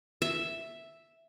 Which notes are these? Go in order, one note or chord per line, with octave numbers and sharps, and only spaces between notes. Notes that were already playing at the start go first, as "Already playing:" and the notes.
E5